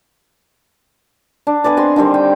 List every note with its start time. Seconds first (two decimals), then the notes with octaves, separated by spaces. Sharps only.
1.47 D4
1.64 B3 G#4 B4 D5
1.77 C4 D#5 C6
1.96 D3 D#3 G3 C4
2.14 G5